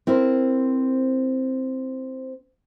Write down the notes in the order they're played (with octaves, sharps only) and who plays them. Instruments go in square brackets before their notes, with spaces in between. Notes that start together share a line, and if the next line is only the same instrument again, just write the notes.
[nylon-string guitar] C4 E4 A#4 C5